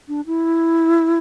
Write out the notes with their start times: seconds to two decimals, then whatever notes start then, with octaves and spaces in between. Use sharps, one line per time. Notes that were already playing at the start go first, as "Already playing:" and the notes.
0.08 D4
0.27 E4